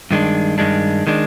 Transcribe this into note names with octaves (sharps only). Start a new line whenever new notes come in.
G2 D#3 G#3 D4
G2 D#3 G#3 D4
D#3 G#3 D4